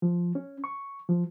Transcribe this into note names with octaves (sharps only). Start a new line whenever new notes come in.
F3
C#4
C#6
F3